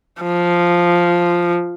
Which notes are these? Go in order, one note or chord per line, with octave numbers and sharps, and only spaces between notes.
F3